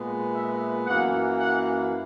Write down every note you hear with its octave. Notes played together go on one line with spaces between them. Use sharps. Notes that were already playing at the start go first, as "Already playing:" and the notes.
Already playing: A#2 G#3 B3
E5
F#2 E3 A#3 F#5
F#5